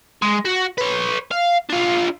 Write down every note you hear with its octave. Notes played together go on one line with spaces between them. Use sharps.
G#3
F#4
B4 C#5
F5
D4 F4